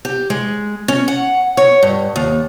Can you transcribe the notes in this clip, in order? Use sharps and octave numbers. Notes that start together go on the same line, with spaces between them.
G4
G#3
C#4
F#5
C#5
G2
D#2